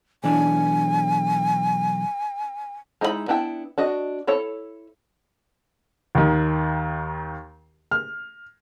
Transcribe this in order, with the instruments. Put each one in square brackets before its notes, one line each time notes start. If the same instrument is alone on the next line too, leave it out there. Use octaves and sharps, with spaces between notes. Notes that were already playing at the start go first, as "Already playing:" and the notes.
[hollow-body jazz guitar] B1 E3 D4 [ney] G#5
[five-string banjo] G#3 D#4 E4 C5 B5
B3 D4 E4 G5
D4 F#4 D#5
E4 A4 C#5
[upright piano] D#2 D#3
F6